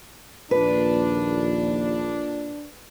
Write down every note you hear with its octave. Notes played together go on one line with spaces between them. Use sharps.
A#1 D#2 A#2 D4 B4